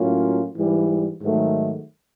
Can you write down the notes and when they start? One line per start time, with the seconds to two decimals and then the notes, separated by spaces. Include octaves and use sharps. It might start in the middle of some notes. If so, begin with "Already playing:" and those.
Already playing: A2 F#3 A#3 C#4 F4
0.55 G#2 E3 G3
1.21 G#2 D#3 F#3 A3